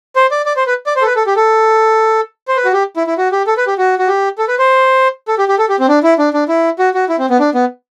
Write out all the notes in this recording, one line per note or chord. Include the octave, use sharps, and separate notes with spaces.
C5
D5
D5
C5
B4
D5
C5
A4
B4
A4
G4
A4
C5
B4
F#4
G4
E4
E4
F#4
G4
A4
B4
G4
F#4
F#4
G4
A4
B4
C5
A4
G4
G4
A4
G4
C4
D4
E4
D4
D4
E4
F#4
F#4
E4
C4
B3
D4
B3